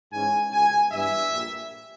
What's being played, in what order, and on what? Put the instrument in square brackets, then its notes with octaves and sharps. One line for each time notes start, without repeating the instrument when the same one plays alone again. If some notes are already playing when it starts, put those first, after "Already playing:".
[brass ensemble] G#2 E3 G#3 C#4 G#5
C#2 B2 G#3 G#5
G2 E3 G3 B3 E5
A#1 A#2 G3